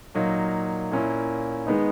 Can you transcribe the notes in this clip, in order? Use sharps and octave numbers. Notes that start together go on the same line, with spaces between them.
A#2 F#3 A#3 D#4
A#2 A#3 C#4 E4
D#3 G#3 B3 D#4